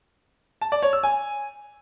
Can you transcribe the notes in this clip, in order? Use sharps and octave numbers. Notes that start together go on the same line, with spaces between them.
A5
D5
C#5
E6
G#5